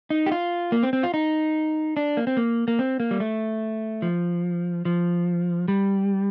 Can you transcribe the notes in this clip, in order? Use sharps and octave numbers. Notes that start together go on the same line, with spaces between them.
D#4
G4
F4
A#3
C4
C4
F4
D#4
D4
A#3
C4
A#3
A#3
C4
A#3
G3
A3
F3
F3
G3